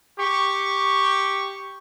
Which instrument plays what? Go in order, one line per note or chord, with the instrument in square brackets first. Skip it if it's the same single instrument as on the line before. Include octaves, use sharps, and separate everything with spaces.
[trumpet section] G4 C#6